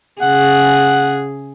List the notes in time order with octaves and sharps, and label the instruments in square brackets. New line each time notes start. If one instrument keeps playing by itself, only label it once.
[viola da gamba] C#3 G#4 [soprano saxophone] F#5